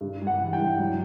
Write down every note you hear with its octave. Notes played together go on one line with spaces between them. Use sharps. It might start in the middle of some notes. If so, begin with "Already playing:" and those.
G2
G3
F#5
E3
G5
G2
F#3